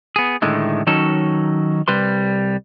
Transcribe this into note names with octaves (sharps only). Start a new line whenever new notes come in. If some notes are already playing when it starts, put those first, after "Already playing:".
B3 G#4
A2 D3 D#3 G#3 A3
D#3 F#3 C#4 D#4 A4
C2 G3 B4 C6